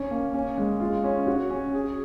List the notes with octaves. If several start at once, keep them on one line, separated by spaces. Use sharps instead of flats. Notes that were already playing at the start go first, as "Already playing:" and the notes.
Already playing: C#4
A#3
C#4
G#3
F4
C#4
F#4
C#4
G#4